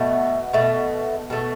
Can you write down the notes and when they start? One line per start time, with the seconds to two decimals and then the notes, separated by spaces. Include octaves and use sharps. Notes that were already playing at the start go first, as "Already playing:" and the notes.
Already playing: B2 A3 B3
0.53 B2 A3
1.30 B2 A3